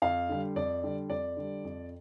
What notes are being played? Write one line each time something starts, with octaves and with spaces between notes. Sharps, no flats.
F2 F5
D3 G3
F2 D5
D3 G3
F2 D5
D3 G3
F2